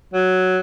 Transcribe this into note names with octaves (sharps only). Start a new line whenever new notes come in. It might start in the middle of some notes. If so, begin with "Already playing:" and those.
F#3